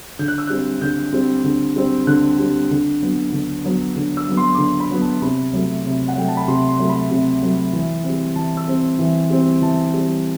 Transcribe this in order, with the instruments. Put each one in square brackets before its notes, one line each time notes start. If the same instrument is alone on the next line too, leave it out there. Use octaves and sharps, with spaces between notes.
[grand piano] D3 G6
F#6
E6
G3 C4 F#6
D3 G6
G3 C4
D3
G3 C4
D3 F#6
G3 C4
D3
F#3 B3
D3
F#3 B3
D3
E6
F#3 B3
C6
D6
D3 C6
B5
F#3 B3
A5
C3 B5
F#3 A3
C3
F#5
F#3 A3 G5
A5
B5
C3 C6
C6
F#3 A3
B5
C3
F#3 A3
E3
G3 C4
E3 A5
E6
G3 C4
E3
G3 C4
E3 A5
G3 C4